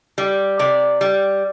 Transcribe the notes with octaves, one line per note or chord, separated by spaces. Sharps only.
G3
C3 D5
G3